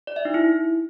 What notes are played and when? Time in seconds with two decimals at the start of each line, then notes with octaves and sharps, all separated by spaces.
0.07 D5
0.16 E5
0.25 D#4
0.34 E4